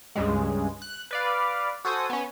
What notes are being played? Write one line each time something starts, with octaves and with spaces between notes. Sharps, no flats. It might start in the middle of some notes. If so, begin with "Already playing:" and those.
C#2 G2 C#3 G#3
F#6
B4 D5 F5
F#4 A4 C5 G#5 D#6
B3 C#4